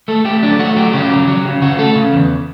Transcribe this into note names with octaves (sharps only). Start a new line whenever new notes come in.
A3 A4
A3 G4
F#3 D4
A3 F#4
F#3 G4
C#3 G4
F#3
F#3
C#3
C#3 F#4
A3 A4
C#3
E2